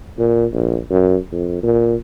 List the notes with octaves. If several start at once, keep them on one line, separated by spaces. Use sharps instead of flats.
A#2
A#1
F#2
F2
A#2